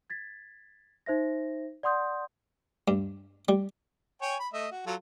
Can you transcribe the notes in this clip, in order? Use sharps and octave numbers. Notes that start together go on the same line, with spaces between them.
G#6 A6 B6
D#4 C5 E5 A#6
D5 F#5 C6 D#6 G6
G2
G3
C#5 G5 G#5
B5
A3 D#5 E5
F#4
F#3 F4 A4